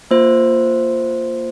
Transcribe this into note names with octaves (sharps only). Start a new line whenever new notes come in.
A#3 F4 C5